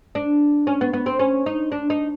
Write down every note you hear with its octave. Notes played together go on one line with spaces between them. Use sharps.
D4
C#4
B3
B3
C4
C#4
D#4
D4
D#4